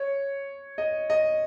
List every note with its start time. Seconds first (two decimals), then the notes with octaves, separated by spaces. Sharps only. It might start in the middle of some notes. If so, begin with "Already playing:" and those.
Already playing: C#5
0.78 D#5
1.10 D#5